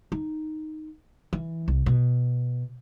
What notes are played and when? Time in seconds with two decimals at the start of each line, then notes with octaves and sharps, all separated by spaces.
0.12 D#4
1.33 E3
1.68 C2
1.86 B2